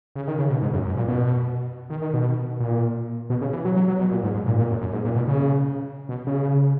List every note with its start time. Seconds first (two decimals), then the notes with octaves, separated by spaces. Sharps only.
0.16 C#3
0.28 D#3
0.39 C#3
0.50 B2
0.62 G#2
0.73 F#2
0.85 F#2
0.97 A#2
1.08 B2
1.90 D#3
2.02 D#3
2.14 B2
2.60 A#2
3.30 B2
3.41 C#3
3.53 E3
3.65 F#3
3.76 F#3
3.88 F#3
3.99 B2
4.11 A#2
4.23 G#2
4.34 G#2
4.46 A#2
4.59 A#2
4.70 F#2
4.81 F#2
4.93 G#2
5.05 A#2
5.16 B2
5.28 C#3
6.09 B2
6.27 C#3